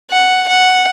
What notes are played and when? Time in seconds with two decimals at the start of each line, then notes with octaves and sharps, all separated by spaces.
0.11 F#5
0.48 F#5